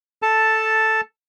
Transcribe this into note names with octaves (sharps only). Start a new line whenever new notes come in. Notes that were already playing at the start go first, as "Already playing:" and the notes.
A4 A5